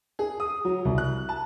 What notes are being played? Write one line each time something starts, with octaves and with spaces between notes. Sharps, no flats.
G#4
D#6
F#3
C2
F#6
A5